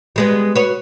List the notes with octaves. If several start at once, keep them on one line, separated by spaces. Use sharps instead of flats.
G3 G#3 B3
F#4 B4 C#5